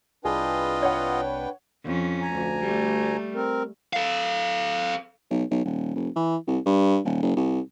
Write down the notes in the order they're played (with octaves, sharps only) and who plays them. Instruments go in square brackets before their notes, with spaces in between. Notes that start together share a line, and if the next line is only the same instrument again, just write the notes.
[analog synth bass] C2 [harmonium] D4 B4 G5 [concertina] F4 D#5 [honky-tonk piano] G#4
[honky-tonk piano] C#5 F#5
[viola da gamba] F2 C#4
[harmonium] D2 G#5 A#5
[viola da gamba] G3 A3
[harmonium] C4 A#4
[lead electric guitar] A4 F5
[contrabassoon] B1
B1
D#1
F1
E3
C2
G2
D#1
F#1
C2